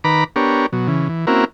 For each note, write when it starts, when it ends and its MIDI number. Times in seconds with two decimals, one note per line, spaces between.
0.04 0.24 51
0.04 0.24 71
0.04 0.24 82
0.04 0.24 83
0.04 0.24 86
0.36 0.66 59
0.36 0.66 62
0.36 0.66 67
0.36 0.66 70
0.36 0.66 73
0.73 0.88 47
0.73 0.88 54
0.88 1.08 49
0.88 1.08 52
1.09 1.26 52
1.27 1.45 58
1.27 1.45 60
1.27 1.45 61
1.27 1.45 64
1.27 1.45 66
1.27 1.45 70